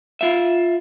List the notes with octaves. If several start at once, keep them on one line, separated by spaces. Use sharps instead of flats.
F4 E5